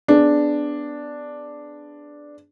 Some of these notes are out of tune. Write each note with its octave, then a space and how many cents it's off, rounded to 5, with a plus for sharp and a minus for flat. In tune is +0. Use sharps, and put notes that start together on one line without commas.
B3 +20 D4 +0 G#4 +0